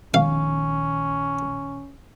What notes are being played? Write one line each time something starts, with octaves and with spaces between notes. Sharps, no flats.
A#1 D#3 C#4 F5